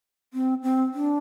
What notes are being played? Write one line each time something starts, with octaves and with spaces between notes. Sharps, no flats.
C4
C4
D4